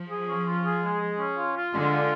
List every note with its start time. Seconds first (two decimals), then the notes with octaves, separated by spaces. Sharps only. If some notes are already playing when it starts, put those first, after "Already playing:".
Already playing: F3
0.10 G#4
0.28 C#4
0.46 F4
0.64 G#4
0.83 G#3
1.01 G#4
1.19 C#4
1.36 F4
1.55 F4
1.72 D3 G#3
1.91 F4